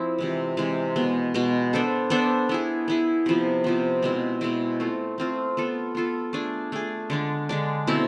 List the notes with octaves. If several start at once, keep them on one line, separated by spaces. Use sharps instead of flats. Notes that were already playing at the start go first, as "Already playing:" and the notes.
Already playing: F3 C4 E4
C3 E3 G#3
C3 E3 G#3
B2 G#3 B3
B2 G#3 B3
B3 D4 A4 C5
B3 D4 A4 C5
B3 E4 G#4
B3 E4 G#4
C3 F3 B3
C3 F3 B3
B2 G#3 C4 E4
B2 G#3 C4 E4
A3 C4 F4
A3 C4 F4
B3 F4 A4
B3 F4 A4
A3 D4 G#4
A3 D4 G#4
D3 G#3 D4
D3 G#3 D4
B2 A3 C4 E4